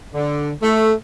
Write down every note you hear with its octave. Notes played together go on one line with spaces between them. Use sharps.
D3
A3